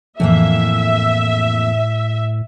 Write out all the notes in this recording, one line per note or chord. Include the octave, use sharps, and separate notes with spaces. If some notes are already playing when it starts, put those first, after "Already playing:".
F2 A2 E3 A#3 E5